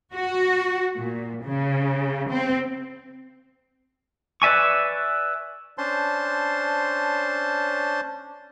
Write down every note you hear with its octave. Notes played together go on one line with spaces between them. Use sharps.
F#4
A#2
C#3
C4
B4 D5 E5 G#5 C#6
C#4 D4 C5 A5 C6